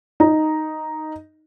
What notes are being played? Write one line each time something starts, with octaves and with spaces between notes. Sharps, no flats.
D#4